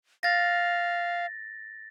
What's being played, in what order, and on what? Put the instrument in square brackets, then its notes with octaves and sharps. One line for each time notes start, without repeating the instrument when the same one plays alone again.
[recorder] F5 [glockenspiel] A6 A#6